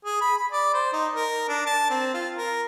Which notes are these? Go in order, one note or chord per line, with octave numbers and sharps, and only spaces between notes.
G#4
B5
B5
D5
C5
D#4
A#4
D4
A5
C4
F4
A#4